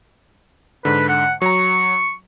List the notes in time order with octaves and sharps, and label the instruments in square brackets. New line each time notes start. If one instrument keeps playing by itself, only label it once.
[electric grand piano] G#2 D3 [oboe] B4
[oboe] F#5
[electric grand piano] F#3 A#5 [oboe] C#6